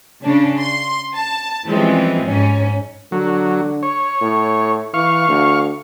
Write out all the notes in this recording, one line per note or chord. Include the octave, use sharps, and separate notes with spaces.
C#3 D4
C6
A5
E3 F3 G3 G#3 C4 C#4
G#2 C#4
D3 F#3
C#5
A2
E3 F5 C#6
D2